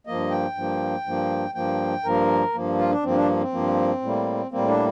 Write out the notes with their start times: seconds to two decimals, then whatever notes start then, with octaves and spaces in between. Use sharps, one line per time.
0.07 G2 F3 A#3 D#5
0.30 G5
0.55 G2 F3 A#3
1.06 G2 F3 A#3
1.55 G2 F3 A#3 G5
2.04 G2 F3 A#3 A#4
2.54 G2 F3 A#3
2.78 F4
2.91 D4
3.03 G2 F3 A#3 C4
3.15 D4
3.41 C4
3.52 G2 F3 A#3
4.02 A2 G3 A#3
4.51 A2 G3 A#3 C4
4.68 D4